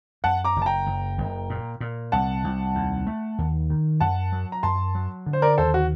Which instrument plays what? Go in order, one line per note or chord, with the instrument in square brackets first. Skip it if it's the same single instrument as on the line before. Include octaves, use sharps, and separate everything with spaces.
[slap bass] F#2 [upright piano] F#5 A5
[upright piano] A#5 D6
[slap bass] F#1
[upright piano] A5
G5 A#5
[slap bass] F#1
F#1
A#2
A#2
[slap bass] C2 [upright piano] F#5 A5
[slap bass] C2
D#2
A3
D#2
D#3
[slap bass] F#2 [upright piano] F#5 A5
[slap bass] F#3
[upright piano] A#5
[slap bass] F#2 [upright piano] A5 C6
[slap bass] F#3
D3
[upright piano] C5
A#4 D5
[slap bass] D#2 [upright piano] A4 C5
[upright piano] F#4